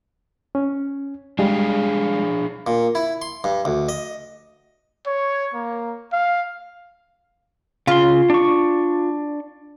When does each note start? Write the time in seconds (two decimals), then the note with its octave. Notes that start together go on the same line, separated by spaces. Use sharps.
0.55 C#4
1.39 G3 G#3 D4 G#4 F5
2.67 A#2
2.95 E4
3.22 C6
3.44 G2
3.65 D2
3.89 D#5
5.07 C#5
5.54 A#3
6.12 F5
7.87 C#3 F4 C6
8.30 D4 C#6